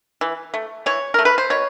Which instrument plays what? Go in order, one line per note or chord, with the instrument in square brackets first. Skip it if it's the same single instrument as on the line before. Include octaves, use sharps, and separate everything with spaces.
[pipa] E3
A3
E3 C#5
A3 A#4
B4
C5
B2 C#5